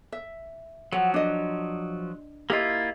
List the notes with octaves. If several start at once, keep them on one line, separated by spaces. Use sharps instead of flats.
E5
F3 F#3 F#5
D4 D#5
A#3 E4 F4 G4 D#5